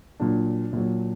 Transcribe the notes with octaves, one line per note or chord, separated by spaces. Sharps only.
A#2 F#3 D4
A#2 F#3